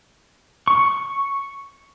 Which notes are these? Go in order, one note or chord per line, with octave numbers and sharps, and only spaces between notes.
C#6